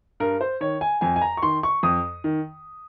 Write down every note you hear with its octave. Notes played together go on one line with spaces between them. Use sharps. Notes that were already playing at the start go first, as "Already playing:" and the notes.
G2 A#4
C5
D#3 C#5
G#5
F2 G#5
G#5
A#5
C#6
D#3 C6
C#6
F2 D#6
D#3